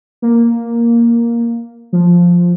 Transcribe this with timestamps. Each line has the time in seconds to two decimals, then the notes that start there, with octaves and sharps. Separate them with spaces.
0.22 A#3
1.93 F3